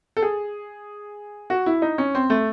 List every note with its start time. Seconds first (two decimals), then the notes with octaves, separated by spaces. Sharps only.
0.17 A4
0.22 G#4
1.50 F#4
1.66 E4
1.82 D#4
1.98 C#4
2.15 C4
2.30 A3